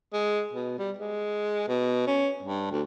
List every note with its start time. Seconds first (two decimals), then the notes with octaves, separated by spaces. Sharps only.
0.13 G#3
0.53 B2
0.78 G3
0.98 G#3
1.68 B2
2.07 C#4
2.43 G2
2.71 D2